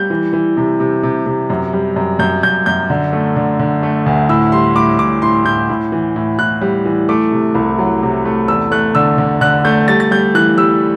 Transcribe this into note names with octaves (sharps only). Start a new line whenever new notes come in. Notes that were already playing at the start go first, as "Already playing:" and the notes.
Already playing: G3 G6
E3
E3
C3
C3
C3
C3
F#2
G3
F#2
F#2 G6
F#2 G6
F#2 G6
D3
A3
D3
D3
A3
D2
A2 E6
G3 C6
A2 D6
A2 D6
A2 C6
A2 G6
A2
E3
A2
A2 F#6
G3
E3
A3 D6
C3
C2
F#3
C3
A3
E2 E6
A3 F#6
D3 E6
D3
D3 F#6
A3 G6
G3 A6
A6
G3 G6
E3 F#6
G3 E6